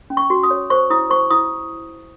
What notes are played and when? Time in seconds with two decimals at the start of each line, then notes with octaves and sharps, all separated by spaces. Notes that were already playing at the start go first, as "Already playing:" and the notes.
0.10 C#4
0.17 C#6
0.30 F#4
0.43 D#6
0.51 C#5
0.70 C5 C#6
0.90 E4 D#6
1.10 C5 C#6
1.31 E4 D#6